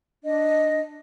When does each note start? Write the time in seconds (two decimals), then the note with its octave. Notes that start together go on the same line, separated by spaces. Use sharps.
0.24 D4 D#5